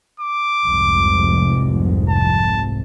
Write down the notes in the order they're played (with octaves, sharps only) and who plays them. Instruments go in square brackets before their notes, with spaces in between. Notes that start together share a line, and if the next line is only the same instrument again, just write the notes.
[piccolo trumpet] D6
[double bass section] F1 C2 G#2
[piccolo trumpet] A5